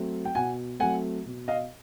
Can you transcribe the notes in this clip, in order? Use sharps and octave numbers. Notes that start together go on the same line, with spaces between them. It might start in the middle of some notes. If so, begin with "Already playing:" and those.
Already playing: F#3 A3 C4
G5
B2 F#5 G#5
F#3 A3 C4 F#5 G#5
B2
D#5 F5